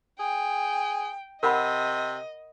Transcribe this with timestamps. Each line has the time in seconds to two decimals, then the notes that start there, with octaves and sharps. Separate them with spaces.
0.19 G#4 G5
1.43 C3 A#4 D#5 F#5 B5